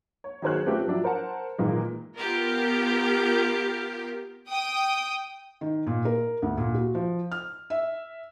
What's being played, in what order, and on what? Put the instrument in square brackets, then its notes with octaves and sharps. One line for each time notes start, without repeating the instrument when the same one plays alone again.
[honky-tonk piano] C#5
D#3 F#3 G#4 C5 C#5 F#6
A3 C4 C#4 F4 G4 B4
F3 F#3 D4 E4
A#4 C5 F#5 A5
A#2 D#3 E3 G#3 A#3
[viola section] B3 F4 G4 A#4
[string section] G5 D#6
[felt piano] D#3
A#2
A#4
D2
A#2
F#4
F3
F6
E5